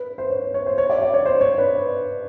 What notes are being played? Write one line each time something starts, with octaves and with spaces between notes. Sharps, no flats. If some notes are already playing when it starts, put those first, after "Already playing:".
Already playing: B4
C5
C#5
C#5
C5
C#5
D5
D5
C#5
C5
C#5
B4